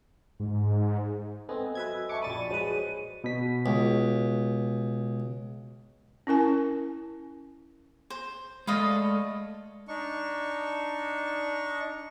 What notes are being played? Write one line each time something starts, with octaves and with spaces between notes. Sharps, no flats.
G#2
B3 C4 A4 D#5 G#5
F#3 B4 E5 G#6
E5 A5 C#6 D6 C#7
A#1 D5 B5 C#6 A6 D#7
F#3 G#3 G#4 B4 C5
B2 B6
C#2
C#4 E4 A#4 G#5
C5
G#3 A3 D5 D#5 F5 B5
D4 D#4 C#6